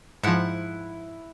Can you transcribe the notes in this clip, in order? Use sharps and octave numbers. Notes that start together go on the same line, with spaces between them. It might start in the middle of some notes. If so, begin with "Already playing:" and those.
G#2 F3 E4 F#5